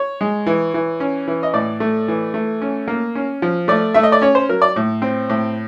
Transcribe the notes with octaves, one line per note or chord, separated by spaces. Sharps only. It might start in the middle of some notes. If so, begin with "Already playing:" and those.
Already playing: C#5
G#3
E3
E3
C#4
E3
D#5
A2 D5
A3
E3
A3
C#4
A#3
C#4
F3
A3 D5
A3 E5
D#5
D5
C#4 C#5
C5
F#3 A#4
D5
A2
C4
A2